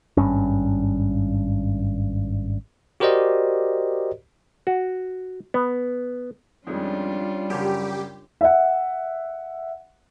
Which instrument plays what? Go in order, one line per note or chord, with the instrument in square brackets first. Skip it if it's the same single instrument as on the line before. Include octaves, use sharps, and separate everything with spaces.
[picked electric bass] G#1 G2 C#4
[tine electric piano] F#4 G4 A#4 C5 D5 D#5
[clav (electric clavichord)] F#4
B3
[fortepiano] F2 D#3 G#3 [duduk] G3 [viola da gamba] C#4 D4 F4
[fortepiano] F#2 C#3 [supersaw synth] G4
[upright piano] E5 F#5